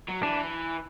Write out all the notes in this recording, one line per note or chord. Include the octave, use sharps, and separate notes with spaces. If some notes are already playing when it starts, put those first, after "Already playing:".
F#3
E3 D4